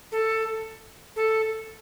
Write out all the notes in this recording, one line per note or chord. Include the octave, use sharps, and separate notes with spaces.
A4
A4